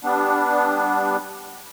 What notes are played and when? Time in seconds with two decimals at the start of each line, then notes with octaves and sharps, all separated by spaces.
0.04 G3 B3 D4